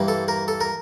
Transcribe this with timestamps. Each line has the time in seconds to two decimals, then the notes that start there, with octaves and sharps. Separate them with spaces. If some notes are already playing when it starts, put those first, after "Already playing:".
Already playing: G2 E3 A#3
0.08 A4
0.28 A#4
0.48 A4
0.61 A#4